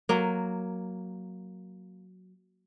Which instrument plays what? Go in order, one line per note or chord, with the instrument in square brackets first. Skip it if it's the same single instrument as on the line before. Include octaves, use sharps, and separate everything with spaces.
[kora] F#3 A#3